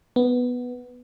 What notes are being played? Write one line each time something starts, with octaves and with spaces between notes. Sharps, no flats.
B3